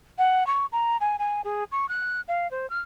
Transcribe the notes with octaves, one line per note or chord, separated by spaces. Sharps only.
F#5
C#6
A#5
G#5
G#5
G#4
C#6
F#6
F5
C5
F6